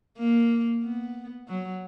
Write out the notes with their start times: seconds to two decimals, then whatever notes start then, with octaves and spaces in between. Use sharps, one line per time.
0.18 A#3
0.83 B3
1.48 F#3